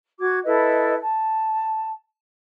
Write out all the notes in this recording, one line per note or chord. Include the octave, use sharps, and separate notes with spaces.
F#4 D6 G#6
E4 A4 B4 D#5
A5